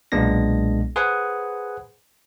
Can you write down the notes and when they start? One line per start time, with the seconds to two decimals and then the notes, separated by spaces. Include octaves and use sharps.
0.12 B1 A#2 G#3 B3 D4 A#6
0.96 G#4 B4 C5 F#5 G#5